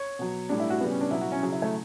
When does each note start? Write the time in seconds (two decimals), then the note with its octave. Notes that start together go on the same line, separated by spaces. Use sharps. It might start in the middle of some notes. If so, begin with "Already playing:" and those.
Already playing: C#5
0.19 B2 F#3
0.49 A2 G3 D4
0.60 E4
0.70 F#4
0.81 C#3 G3 B3
0.91 C#4
1.01 D4
1.11 B2 F#3 E4
1.21 F#4
1.32 C#4
1.42 C#3 F#3
1.52 E4
1.62 A3